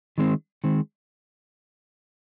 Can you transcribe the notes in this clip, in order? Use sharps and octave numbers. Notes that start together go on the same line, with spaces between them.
D#3 G#3 C4
D#3 G#3 C4